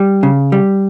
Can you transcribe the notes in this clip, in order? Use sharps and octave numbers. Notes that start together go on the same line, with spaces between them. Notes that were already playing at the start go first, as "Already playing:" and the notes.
Already playing: G3
C#3
G3